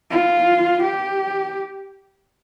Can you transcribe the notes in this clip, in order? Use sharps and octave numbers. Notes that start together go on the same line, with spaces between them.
F4
G4